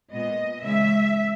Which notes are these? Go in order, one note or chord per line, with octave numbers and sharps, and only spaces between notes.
A#2 G#3 B3 D#5
C#3 E3 G#3 E5